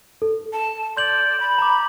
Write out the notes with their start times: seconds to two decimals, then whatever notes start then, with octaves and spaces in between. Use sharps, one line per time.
0.22 A4
0.53 A5
0.97 D5 C6 G6 F#7
1.40 B5
1.58 A#5 D6